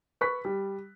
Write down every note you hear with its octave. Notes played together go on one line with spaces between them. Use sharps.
B4 C#6 F#6 B6
G3